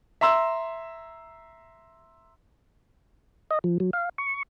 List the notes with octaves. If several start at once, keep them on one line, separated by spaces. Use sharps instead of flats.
E5 A#5 C6 E6
D#5
F3
F#3
F5
C#6